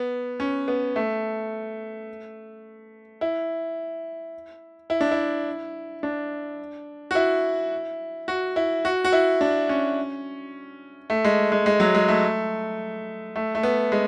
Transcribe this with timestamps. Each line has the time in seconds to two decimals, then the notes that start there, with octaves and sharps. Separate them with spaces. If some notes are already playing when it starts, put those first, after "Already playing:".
Already playing: B3
0.40 C#4
0.68 B3
0.96 A3
3.21 E4
4.90 E4
5.01 D4
5.11 E4
6.03 D4
7.11 F#4
7.15 E4
8.28 F#4
8.56 E4
8.85 F#4
9.05 F#4
9.13 E4
9.41 D4
9.69 C#4
11.10 A3
11.25 G#3
11.52 G#3
11.66 G#3
11.80 F#3
11.95 G#3
12.08 A3
13.36 A3
13.55 A3
13.63 B3
13.92 G#3